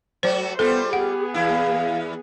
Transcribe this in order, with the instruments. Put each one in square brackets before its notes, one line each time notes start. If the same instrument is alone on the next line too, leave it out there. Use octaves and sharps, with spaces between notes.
[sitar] F#3 A3 F#4 [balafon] C5 D5
[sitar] G3 F4 [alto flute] B3 [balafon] A4 [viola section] C5
[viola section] B3 G#4 [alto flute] G4 [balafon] F#5
[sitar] E2 E4 [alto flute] F5